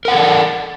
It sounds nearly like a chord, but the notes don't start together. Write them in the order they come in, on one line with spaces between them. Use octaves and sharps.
A#4 F#5 C5 A4 D5